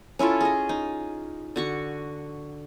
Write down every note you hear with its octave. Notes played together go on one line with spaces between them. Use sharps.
C#4 E4 F4 A4
G#4 D#5
D#4
D3 F#4 C#6